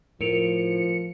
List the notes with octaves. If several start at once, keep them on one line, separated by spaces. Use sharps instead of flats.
A2 F3 A#4 C#7 D7 F7